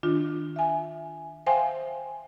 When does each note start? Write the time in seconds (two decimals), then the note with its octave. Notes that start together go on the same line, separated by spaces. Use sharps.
0.03 D#3 D4 F4
0.56 E5 G#5
1.47 C5 E5 F5 G5 G#5 C6